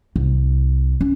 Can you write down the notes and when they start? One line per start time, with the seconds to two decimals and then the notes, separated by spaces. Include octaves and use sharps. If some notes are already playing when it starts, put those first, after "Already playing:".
0.16 C2
1.01 C#4